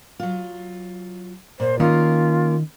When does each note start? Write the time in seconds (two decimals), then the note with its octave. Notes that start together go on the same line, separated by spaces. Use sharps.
0.20 F#3 F4
1.60 A#2 C5
1.80 D#3 A#3 C#4 F4 A#4